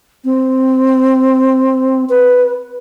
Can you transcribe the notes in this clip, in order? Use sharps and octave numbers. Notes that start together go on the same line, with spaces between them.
C4
B4